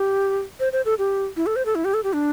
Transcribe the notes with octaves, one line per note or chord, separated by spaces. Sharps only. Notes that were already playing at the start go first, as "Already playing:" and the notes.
Already playing: G4
C5
C5
A4
G4
E4
A4
C5
A4
E4
G4
A4
G4
D4